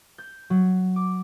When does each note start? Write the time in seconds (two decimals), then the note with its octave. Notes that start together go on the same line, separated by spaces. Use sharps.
0.18 G6
0.50 F#3
0.96 D6